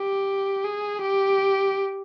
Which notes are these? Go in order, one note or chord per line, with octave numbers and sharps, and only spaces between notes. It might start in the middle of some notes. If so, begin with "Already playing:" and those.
Already playing: G4
G#4
G4